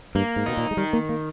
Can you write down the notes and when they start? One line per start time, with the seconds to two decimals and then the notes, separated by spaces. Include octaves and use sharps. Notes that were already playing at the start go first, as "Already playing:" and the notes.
0.15 G2 A#3
0.36 G#2
0.46 B2 D#4
0.57 A#2
0.71 G#3
0.77 D#3 G3
0.93 A#3
1.09 A#3